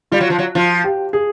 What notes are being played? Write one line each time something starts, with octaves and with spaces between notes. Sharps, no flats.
G3 F4
F#3
F3
F#3
F3 F4
G4
G#4